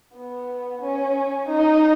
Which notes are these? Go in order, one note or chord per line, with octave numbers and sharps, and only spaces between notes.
B3
C#4
D#4